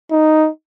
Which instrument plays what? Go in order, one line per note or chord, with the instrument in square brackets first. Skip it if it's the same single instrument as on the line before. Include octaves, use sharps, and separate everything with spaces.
[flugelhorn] D#4